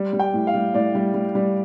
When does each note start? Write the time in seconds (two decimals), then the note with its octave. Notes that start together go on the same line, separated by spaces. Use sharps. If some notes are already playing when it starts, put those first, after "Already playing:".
Already playing: G3
0.13 G3
0.19 G5
0.34 A2
0.47 F5
0.54 G3
0.74 A2 D5
0.95 G3
1.14 G3
1.35 G3